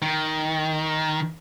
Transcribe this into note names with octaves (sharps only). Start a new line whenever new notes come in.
D#3